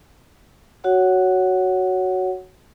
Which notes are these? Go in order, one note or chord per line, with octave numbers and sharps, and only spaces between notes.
F#4 C#5 F#5